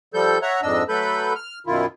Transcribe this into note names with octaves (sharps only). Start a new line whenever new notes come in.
F3 G3 A4 G6
C#5 E5 F#5 A#5
F2 G#2 D4 D#5 E6
F#3 A3 A4 B4 B5 G6
F6
F#2 B2 D#3 E4 F4